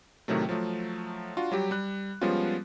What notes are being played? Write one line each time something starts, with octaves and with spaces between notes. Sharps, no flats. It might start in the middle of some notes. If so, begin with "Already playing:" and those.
A2 C3 D#3 F#3 A3
F3 F#3 A3
D4 F4 F#4
F#3 G3 G4
G3 F#6
F3 G3 G#3 B3 C#4 F4